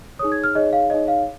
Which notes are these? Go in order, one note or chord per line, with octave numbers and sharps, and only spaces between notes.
D#4 G#4 C#5 D#6
G#6
F6
D#4 G#4 C#5 D#5
F5
D#4 G#4 C#5 D#5
F5